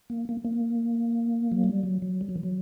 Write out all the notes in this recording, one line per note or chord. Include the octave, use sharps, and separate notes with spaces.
A#3
A#3
A#3
F#3
G3
F#3
F#3
G3
F#3
E3
F#3